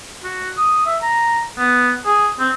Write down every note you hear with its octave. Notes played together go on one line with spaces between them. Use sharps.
F#4
D#6
E5
A#5
B3
G#4
C4